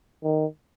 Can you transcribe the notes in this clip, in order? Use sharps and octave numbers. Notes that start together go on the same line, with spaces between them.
D#3